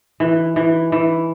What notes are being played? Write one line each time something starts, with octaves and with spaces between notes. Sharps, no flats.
E3
E3
E3